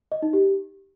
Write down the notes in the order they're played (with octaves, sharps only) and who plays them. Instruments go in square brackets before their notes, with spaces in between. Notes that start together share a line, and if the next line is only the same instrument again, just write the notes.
[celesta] D#5
D#4
G4